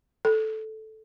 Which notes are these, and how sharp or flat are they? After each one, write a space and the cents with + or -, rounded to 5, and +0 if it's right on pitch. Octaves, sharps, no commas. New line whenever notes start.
A4 -10